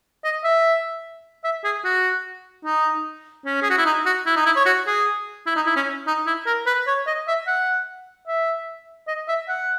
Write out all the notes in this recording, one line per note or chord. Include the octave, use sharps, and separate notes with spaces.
D#5
E5
E5
G#4
F#4
D#4
C#4
G#4
F#4
E4
D#4
F#4
E4
D#4
E4
C#5
F#4
G#4
E4
D#4
E4
C#4
D#4
E4
A#4
B4
C#5
D#5
E5
F#5
E5
D#5
E5
F#5